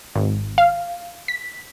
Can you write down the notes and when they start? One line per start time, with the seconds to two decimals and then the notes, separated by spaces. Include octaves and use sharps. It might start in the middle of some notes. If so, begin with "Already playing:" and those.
0.15 G#1
0.58 F5
1.28 B6